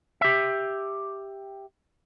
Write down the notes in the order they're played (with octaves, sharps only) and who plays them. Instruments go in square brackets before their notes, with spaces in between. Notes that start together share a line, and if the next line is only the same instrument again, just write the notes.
[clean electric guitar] G4 E5